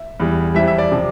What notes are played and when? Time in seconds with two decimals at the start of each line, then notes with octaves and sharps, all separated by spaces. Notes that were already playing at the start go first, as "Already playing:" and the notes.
Already playing: E5
0.20 E2 E3 G3
0.55 F2 E3 G3 E5
0.68 E5
0.78 D5
0.92 C3 F3